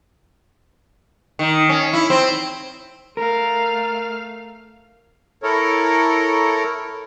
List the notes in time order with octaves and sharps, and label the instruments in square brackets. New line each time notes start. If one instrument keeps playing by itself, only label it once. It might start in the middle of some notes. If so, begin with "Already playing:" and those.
[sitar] D#3
C#4
E4
C4
[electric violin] A3 F5 [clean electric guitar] A#4
[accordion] E4 A4 A#4 C#5